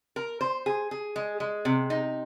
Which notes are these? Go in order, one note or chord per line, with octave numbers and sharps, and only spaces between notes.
A#4
C5
G#4
G#4
G#3
G#3
C3
D#4